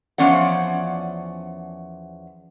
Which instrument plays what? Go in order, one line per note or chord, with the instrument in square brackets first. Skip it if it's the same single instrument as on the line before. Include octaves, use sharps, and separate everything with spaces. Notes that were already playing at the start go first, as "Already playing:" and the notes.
[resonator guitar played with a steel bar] E2 F3 C#4 D5 F#5